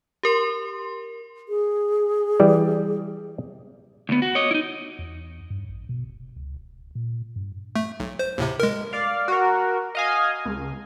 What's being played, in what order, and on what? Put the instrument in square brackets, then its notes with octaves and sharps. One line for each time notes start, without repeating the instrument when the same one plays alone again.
[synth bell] G4 A#4 C6
[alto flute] G#4
[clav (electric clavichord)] E3 G3 D5
[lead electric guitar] D2 B3
F#4
C#5 D#5
D#4 E4
[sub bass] E2
G2
A1
B2
D#1
C#2
D1
A#2
G2
[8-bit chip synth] A3
B1
C5
D#2 A2 C3
G#3 A#4
[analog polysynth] D5 F5
F#4 A#4
D#5 F5 G#5
C#2